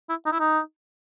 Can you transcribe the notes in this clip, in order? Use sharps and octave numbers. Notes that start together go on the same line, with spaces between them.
E4
D#4
E4
D#4